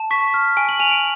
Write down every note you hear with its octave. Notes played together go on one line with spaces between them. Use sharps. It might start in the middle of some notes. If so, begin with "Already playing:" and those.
Already playing: A5
C#6 B6
F6
G#5 D7
F#7
G#5 F7
D7